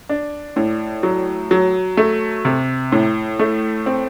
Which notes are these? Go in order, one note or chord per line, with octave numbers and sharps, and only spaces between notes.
D4
A2
F#3
F#3
A3
C3
A2
A3
C4